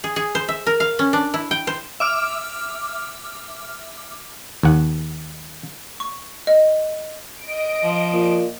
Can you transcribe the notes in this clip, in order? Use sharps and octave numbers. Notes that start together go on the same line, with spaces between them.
G#4
G#4
C5
E5
A#4
F5
C#4
D4
E4
G5
C5
E5 D6 F6
D#2 F#5
C#6
D#5
D#5 D7
F3
A#2